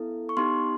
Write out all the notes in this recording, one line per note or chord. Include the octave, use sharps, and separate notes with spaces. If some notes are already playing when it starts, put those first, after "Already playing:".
Already playing: B3 E4 A4
C#6
B3 D#4 G4 C6